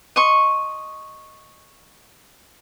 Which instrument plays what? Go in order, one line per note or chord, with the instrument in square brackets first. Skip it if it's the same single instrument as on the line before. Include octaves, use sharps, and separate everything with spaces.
[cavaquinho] D#5 C6 C#6